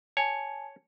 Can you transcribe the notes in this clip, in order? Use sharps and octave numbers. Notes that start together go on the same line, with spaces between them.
C#5 G#5 A5